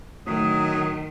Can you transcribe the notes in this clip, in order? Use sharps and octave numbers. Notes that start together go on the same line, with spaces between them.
A2 D#3 F#3 D#6